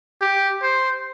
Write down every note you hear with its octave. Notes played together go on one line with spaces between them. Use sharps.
G4
C5